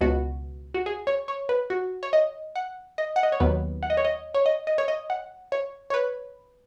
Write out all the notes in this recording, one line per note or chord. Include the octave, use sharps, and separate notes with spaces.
C#2 B2 B3 F#4
F#4
G#4
C#5
C#5
B4
F#4
C#5
D#5
F#5
D#5
F#5
D#5
C#5
D#2 D#3 F#3 B3 B4
F#5
D#5
C#5
D#5
C#5
D#5
D#5
C#5
D#5
F#5
C#5
C#5
B4